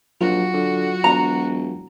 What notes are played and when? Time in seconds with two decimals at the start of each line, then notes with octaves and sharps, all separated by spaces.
0.21 A#1 F#3 F4 F#4
0.54 D3
1.04 E1 A#5